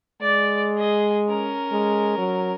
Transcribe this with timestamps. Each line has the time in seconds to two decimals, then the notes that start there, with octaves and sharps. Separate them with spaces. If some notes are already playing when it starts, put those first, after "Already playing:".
0.21 G#3 D5
0.76 G#4 D#5
1.29 C#4 A#4
1.72 G#3
2.18 F#3